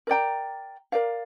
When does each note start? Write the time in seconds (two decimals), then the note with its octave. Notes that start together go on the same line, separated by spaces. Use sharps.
0.07 A#4 D5 G5 A#5
0.92 A#4 D5 F5